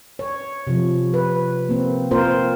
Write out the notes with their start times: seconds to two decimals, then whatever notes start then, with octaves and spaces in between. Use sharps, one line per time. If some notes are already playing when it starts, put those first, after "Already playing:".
0.19 C#5
0.67 C3 F3
1.14 B4
1.69 A#3 C4
2.11 A#3 C4 F4 A#4 C5